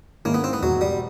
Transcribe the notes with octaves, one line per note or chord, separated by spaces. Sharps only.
G#2 D#3 G#3 A#3 C#4 E4
B3
C4
B3
E2 B2 F#3 G#3
G3